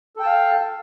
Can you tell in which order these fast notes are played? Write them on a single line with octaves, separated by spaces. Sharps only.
A4 G5 A5 F5